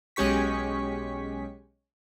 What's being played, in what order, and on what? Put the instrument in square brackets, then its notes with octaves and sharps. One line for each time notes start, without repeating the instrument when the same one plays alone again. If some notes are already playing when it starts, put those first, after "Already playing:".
[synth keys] B1 G#3 C#4 G4 C#6 B6